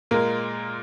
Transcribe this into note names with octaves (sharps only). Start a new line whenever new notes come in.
A#2 G#3 A#3 A#4